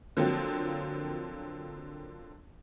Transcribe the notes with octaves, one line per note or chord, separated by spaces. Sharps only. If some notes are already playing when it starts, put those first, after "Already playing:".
D3 F3 F#3 A#3 C4